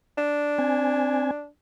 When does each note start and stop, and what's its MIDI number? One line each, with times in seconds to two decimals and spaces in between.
0.18 1.47 62
0.59 1.31 60
0.59 1.31 80